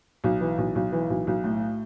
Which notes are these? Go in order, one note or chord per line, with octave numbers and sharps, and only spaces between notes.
B1
E3
B1
B1
E3
B1
B1
A2